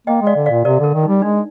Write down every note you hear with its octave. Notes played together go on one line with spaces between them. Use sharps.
A#3 D#5 G5
G#3
D5 F5
D3
A#2 D5 F5
C3 A#4 D5
D3 A#4
D#3
G3 D#4
G#3 D4